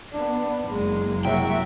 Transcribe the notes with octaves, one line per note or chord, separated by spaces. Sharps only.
B3 D4
F#1 G#3 A#3
C2 F#3 G#3 F#4 E5 G5